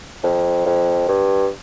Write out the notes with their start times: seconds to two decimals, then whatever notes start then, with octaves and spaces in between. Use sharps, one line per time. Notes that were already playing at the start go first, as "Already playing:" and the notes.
0.24 F2
0.66 F2
1.09 G2